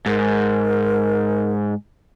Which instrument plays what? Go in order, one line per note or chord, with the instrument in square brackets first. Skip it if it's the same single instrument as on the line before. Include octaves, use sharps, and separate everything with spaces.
[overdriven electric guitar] G#2 [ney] A#4